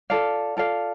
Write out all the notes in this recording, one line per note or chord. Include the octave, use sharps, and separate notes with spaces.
F4 A4 D5 F5
F4 A4 D5 F5